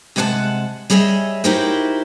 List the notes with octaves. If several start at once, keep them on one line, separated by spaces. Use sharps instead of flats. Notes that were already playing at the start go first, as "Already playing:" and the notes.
C3 G#3 B4 D5 F#5 A5
G3 G#4 C#5 D#5 E5
D#4 E4 F#4 G4 A#4 C5